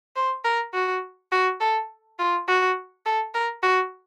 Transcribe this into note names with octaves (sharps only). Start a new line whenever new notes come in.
C5
A#4
F#4
F#4
A4
F4
F#4
A4
A#4
F#4